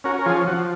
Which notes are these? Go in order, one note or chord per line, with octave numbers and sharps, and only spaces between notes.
C#4 F#4 A#4
A#4
F3 F4 G#4
F3 F#4